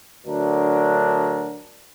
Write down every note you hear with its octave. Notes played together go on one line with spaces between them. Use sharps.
D2 D3 F#3 D4 A#4